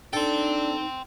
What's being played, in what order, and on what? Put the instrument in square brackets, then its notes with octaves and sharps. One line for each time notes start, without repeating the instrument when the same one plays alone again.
[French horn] D4 [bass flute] D#4 [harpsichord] A4 [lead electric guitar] G5 C6